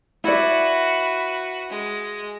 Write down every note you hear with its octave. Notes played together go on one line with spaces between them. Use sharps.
E4 F#4 B4 D5
G#3